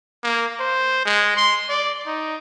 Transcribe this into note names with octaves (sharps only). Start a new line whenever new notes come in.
A#3
C5
G#3
C6
D5
D#4